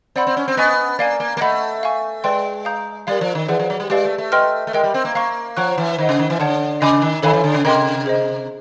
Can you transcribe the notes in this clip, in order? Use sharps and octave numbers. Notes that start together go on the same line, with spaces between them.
C4 D5 F#5 B5
C4
C#4
C4
B3 D#5 G#5 C#6
A#3 D5 F5 G#5
A#3
A#3
A3 D#5 F#5 B5
F5 G#5 C#6
G#3 B4 D5 G5 C6
F5 A#5 D#6 G6
G3 A#4 D5 F5
F3
D#3
E3 G#4 B4 D5 F#5
F3
F#3
G3
G#3 G4 B4 D5 F5
A3
A3
B4 D#5 G5 C6 F6
A3
G#3 A#4 D#5 G5
G3
C4
A#3
A#3 F5 A#5 C#6
F3 C#5 F#5 A#5 C#6 F#6
E3
D#3 C5 D#5 F#5
C#3
D#3
E3
D3 C#5 F#5 A5
C#3 D#5 G#5 B5 D6
D#3
D#3 A4 C#5 F5 G#5 B5
E3
D3
C#3
C3 A#4 D#5 G5 C6
G#4 C5 D#5